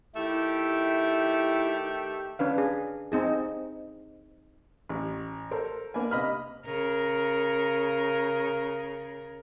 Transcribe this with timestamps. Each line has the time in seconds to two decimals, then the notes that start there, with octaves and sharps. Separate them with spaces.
0.16 D#3 A3 E4 G4
2.39 C#4 D4 B4 F5
2.58 G#4
3.12 C4 D#4 G#4
4.89 A1
5.51 A4 A#4 C5
5.94 A#3 D4 B4 G#5
6.11 C3 D#5 B5 F6
6.66 C#3 A#4